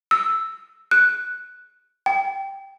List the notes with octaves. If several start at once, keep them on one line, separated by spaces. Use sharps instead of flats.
E6
F#6
G5